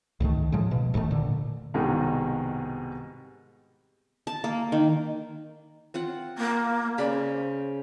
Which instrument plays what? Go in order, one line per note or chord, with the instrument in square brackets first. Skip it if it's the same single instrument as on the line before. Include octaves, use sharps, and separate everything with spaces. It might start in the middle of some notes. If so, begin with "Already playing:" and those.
[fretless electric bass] C#2 G#2 D#3 A3
A2 F3 G#3
B2
D#1 G#2 D#3 A3
A#2 D3
[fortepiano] C2 G#2 B2 D#3 G3
[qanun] A5
A#3
D#3
C4 F4 F#5
[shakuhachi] A#3
[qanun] C#3 B5 [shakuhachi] D5
[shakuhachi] C5